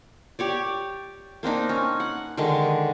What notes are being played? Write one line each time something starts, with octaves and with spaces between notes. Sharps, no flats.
G4 C#5 D5
A#3 C4 D4 D#4
C#4
F#5
D3 D#3 G#3